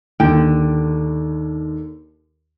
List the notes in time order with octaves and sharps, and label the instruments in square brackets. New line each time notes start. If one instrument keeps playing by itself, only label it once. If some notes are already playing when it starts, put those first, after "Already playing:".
[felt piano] D#2 [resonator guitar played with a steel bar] D3 G5